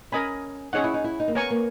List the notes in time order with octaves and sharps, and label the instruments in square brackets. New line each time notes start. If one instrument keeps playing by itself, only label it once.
[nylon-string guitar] C#4 [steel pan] A#4 D#5 G#5 B5
[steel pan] C#4 G#4 C#5 F#5 [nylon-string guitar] D#4
[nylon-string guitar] E4
D#4
E4
D#4
A#3
[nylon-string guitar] B3 [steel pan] A#4 C#5 G#5 C#6
[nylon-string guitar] A#3